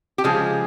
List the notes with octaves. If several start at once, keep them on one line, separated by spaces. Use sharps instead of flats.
G4
C#3 F3 G#3 G#4